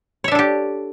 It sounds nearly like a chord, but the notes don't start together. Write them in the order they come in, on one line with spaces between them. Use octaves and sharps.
C#5 E5 D4 A4 G4